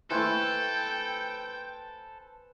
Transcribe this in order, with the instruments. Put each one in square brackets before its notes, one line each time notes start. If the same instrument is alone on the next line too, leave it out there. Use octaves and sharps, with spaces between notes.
[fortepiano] A3 E4 [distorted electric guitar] A4 [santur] B4 C5 G#5 [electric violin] G5